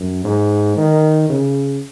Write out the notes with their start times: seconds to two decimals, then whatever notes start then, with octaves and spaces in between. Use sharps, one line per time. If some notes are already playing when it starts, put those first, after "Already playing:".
Already playing: F#2
0.24 G#2
0.77 D#3
1.29 C#3